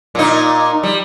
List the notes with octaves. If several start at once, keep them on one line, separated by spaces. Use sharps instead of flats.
A#2 D#4
G3